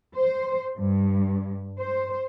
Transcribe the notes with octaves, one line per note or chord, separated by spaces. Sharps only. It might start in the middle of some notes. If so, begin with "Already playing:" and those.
C5
G2
C5